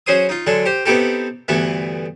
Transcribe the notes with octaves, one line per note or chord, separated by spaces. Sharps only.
F#3 C#4 G#4 C5 C6 D#6
D#4 F4
D3 F#3 G#3 A4
G4 C5
B3 C4 D#4 E4 G4 A4
D2 G2 E3 A3 B3